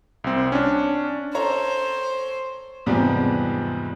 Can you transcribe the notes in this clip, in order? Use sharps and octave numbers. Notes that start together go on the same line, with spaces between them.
C2 C4
C#4 D4
A4 C5 C#5 A#5
E2 G#2 C3 F3 G3 B3